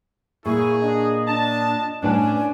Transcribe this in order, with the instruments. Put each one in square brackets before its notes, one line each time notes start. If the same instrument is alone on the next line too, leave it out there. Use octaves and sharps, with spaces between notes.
[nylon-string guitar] A#2 [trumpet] E4 [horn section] G#4 [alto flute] C#6
[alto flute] D4 [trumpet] D#5
[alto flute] D4 [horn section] A5
[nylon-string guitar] A2 B4 A5 [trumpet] C#4 [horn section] D4 [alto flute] G#5